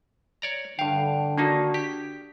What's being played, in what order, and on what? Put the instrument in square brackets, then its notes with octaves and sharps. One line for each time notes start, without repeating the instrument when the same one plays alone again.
[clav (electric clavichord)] C#5 D5 A#5
[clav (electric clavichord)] G2 F5 [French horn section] D3 [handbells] G5
[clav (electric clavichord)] D#3 A#3 D#4 [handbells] D4 F#4
[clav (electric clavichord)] G4 [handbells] B6